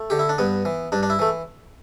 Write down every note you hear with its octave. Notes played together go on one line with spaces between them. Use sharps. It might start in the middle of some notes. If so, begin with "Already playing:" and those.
Already playing: A3
D3 G4
E4
D4
G2 B3
E3
G2 D4
D4
E4
E3 A3